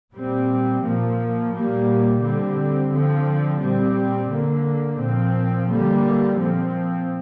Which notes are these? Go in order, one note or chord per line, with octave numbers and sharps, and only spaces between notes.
A#2 G3 C4
A#2 F3 A#3
A#2 G3 A#3
D3 G3 C4
D3 F3 C4
A#2 G3 C4
D3 A#3
A#2 F3 C4
D3 G3 A#3
A#2 F3 C4